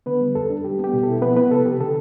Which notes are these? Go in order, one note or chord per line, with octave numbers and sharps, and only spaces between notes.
D3 B3 B4
G3
F2 A4
D4
G3 G4
B3 G4
B2
E4 A4
F3 B3 B4
B3 B4
C3 A4
C3 G4
D3 A4